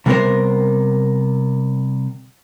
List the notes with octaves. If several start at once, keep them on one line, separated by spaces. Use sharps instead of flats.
C3 G3 B3 A4 A#4 C5